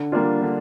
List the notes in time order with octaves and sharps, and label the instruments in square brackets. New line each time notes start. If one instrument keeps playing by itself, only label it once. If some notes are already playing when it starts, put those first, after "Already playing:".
Already playing: [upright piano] D3
G3 A#3 D4 F4
D3